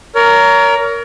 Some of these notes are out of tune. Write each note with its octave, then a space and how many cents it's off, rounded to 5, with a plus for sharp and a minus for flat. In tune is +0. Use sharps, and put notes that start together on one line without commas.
A#4 +0 C#5 +30